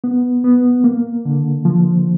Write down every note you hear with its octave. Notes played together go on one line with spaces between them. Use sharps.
B3
B3
A#3
D3
F3